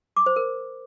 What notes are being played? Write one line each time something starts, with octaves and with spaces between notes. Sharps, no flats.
D6
C5
A#4